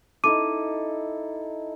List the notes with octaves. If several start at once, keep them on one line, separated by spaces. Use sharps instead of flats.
D#4 E4 A4 D6 D#7